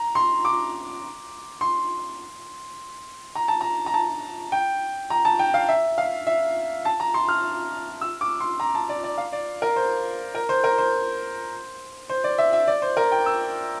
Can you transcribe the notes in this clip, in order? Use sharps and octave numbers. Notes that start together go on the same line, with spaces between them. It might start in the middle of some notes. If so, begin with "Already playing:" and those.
Already playing: A#5
C6
D6
C6
A#5
A5
A#5
A#5
A5
G5
A#5
A5
G5
F5
E5
F5
E5
A5
A#5
C6
F6
E6
D6
C6
A#5
A5
D5
D5
F5
D5
A#4
C5
A#4
C5
A#4
C5
C5
D5
E5
E5
D5
C5
A#4
G5
E6